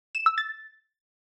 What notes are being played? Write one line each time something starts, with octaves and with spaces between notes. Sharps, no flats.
E7
E6
A6